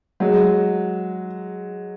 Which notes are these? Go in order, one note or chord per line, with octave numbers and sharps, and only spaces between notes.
F#3 G#3